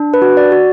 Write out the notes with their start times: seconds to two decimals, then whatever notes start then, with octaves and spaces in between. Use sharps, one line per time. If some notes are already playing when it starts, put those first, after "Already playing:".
Already playing: D4
0.14 B4
0.22 F#4
0.37 D5
0.52 F#4